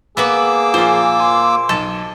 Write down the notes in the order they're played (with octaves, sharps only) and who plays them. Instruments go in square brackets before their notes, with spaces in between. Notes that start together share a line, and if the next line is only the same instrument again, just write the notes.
[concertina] A#3 D6 E6 [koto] B3 F#4 B4 [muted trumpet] G#4
[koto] A#2 C5 [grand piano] F3 F4
[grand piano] G#5 [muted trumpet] C6
[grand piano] B1 [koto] A4